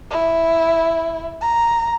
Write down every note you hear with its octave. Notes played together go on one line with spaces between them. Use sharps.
E4
A#5